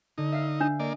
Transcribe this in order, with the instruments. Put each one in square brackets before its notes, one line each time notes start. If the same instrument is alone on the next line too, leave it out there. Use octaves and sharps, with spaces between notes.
[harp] D3 [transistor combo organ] D#4
[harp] E5 F5
[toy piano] D4
[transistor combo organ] A#3 D5 [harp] D#5